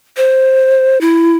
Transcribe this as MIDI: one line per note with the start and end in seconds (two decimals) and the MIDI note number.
0.17 1.00 72
1.01 1.37 64